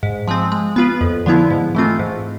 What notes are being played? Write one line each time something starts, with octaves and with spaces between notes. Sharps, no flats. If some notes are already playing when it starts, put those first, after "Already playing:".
G#2
F3 G#3 C4
G#3
B3 F4 B4
F2
D3 F3 B3 E4
G#2
E3 A3 C4 F4
G#2